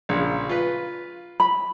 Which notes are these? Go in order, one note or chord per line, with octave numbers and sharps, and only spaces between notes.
A#1 A#2 C#3
F4 B4
B5